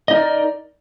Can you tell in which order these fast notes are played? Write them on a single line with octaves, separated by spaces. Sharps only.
D#5 D#4 A#4 D5